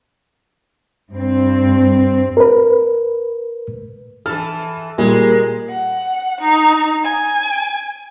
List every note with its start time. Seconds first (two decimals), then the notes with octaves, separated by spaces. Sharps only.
1.12 G2 C4
2.37 A#4 B4
4.26 E3 A4 F6
4.98 A#2 G3 G#3 A#4
5.69 F#5
6.41 D#4
7.05 G#5